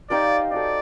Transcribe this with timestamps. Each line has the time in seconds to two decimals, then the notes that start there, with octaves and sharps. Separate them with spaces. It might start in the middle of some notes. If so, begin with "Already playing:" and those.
0.10 D#4 G4 C5 D5 F5
0.51 D#4 F#4 A4 D5